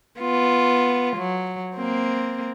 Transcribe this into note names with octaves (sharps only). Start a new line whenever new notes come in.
B3 F4
F#3
A#3 C4